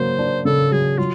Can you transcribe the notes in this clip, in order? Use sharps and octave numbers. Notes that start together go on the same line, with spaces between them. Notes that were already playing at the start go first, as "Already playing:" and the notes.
Already playing: C#3 F#3 A#3 C5
D4
C#3 A4
F#3 G#4
F#3 F4